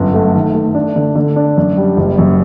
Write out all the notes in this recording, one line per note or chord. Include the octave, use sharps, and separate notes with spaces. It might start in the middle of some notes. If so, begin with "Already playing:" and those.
Already playing: G1 F#2
A3
D#3
A3
D4
D3
D3
D4
F#2
G3
F#1
F#2